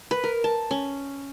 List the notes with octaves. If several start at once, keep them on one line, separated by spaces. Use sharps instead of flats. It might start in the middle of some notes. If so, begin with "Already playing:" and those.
B4
A#4
A5
C#4